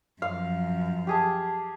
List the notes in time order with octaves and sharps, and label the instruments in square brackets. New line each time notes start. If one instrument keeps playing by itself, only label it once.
[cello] F#2 F3 [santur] F5
[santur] G4 G#4 A5